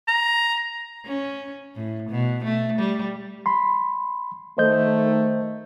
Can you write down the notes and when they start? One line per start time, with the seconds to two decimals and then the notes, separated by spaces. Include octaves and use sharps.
0.08 A#5
1.06 C#4
1.76 A2
2.10 B2
2.44 A3
2.79 G3
3.46 B5 C6
4.58 D#3 A3 C5 D#5 G6